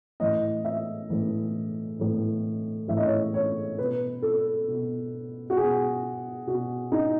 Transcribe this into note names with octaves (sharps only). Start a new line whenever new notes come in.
A2 E3 D#5
E5
A2 E3
A2 E3
A2 E3 E5
D#5
C#5
D#5
C#5
B2 B4
A4
B2
F#4
B2 G#4
B2 F#4
D#4